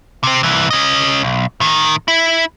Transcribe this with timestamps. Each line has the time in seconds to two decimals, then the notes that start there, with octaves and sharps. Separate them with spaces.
0.23 C3 C4
0.43 C2 E3
0.71 C#4 D#5
1.23 B1
1.60 A2 D#3
2.08 E4